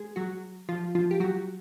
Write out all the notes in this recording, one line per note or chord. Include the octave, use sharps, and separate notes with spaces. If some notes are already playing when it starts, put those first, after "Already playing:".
Already playing: G#3 G#4
F#3 F#4
F3 F4
F3 F4
G4
F#3 F#4